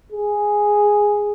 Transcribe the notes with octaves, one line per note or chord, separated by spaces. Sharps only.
G#4